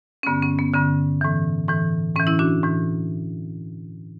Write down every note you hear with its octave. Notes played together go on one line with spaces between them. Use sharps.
C#4
G2 D3 B3
C#4
B3
G2 D3 C#4
A2 E3
A2 E3
A2 E3 C#4
C#4 E4
D4 F#4
A2 E3